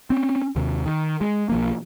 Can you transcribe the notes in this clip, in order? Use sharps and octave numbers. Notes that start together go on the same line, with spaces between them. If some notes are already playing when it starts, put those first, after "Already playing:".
C4 C#4
D#2 C3
D#3
G#3
B1 F3 A#3